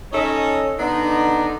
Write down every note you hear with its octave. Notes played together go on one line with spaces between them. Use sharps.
C#4 D#4 A4 C#5 D#5
D3 B3 D4 D#4